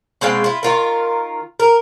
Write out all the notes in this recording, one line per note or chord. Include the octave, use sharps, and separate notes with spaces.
B2 G#3 C4 F5
E4 F4
D#3 F4 A#4
A#4